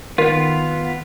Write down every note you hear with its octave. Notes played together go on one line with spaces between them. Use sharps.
D#3 B3 F4 B6